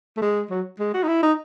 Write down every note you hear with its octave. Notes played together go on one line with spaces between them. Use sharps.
A3
G#3
F#3
G#3
F#4
D#4
E4
D#4